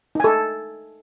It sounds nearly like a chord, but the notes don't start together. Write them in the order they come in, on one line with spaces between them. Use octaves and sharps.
D#4 G#5 A4